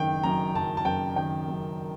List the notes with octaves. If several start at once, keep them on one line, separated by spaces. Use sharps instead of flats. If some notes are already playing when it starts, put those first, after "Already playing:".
Already playing: F#1 D#3 G5
F#2 A#5
F#1 A5
A5
F#1 G5
D#3 G5
F#2